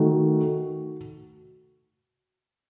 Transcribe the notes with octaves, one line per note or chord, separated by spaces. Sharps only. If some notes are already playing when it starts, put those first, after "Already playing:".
Already playing: D#3 A3 F#4